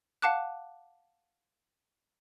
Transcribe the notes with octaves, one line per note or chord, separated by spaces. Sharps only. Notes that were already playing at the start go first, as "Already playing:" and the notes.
F5 F#5 A5 D6 F#6